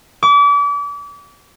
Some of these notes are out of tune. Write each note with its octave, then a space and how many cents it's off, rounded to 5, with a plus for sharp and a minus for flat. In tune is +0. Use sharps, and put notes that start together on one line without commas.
D6 -35